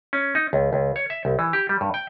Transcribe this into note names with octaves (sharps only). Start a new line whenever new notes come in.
C#4
D#4
C#2
C#2
C#5
E5
C2
E3
G4
G3
G2
G5